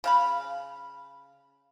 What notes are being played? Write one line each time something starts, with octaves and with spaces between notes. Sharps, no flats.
C#3 F5 B5